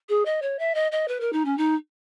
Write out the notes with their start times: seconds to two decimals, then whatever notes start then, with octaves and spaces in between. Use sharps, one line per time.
0.09 G#4
0.25 D#5
0.42 C#5
0.59 E5
0.75 D#5
0.92 D#5
1.08 B4
1.20 A#4
1.33 D#4
1.45 C#4
1.58 D#4